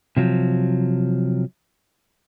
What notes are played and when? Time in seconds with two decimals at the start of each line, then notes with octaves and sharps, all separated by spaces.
0.17 C3 F3 F#3